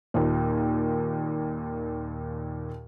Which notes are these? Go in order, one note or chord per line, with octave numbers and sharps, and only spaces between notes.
D#2 A#2